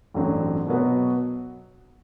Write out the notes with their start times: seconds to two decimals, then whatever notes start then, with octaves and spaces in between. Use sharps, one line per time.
0.14 A1 G2 F#3 C4
0.66 B2 F#3 B3 F#4